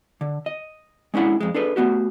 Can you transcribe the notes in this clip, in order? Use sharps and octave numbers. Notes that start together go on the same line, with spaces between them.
D3
D#5
G#3 C#4 D4 E4 F#5
F2 G#3
D4 G#4 A4 B4
A3 B3 F#4 G4